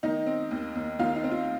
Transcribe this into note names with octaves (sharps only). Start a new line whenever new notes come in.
D#3 D#4 D#5
C4
D#2
D#2
D#3 F4 F5
D#4
C4
F4